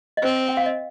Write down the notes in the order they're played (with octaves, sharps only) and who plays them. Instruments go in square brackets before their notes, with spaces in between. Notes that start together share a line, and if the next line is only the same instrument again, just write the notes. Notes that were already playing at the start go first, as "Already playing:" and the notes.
[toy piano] D#5
[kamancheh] C4 [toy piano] C5
[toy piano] G5
F5
D#5